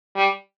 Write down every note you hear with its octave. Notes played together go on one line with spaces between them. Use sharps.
G3